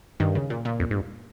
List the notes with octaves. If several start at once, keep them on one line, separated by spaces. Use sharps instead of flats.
G2 D#3
C#3
A#2
A#2
F2
G#2
G2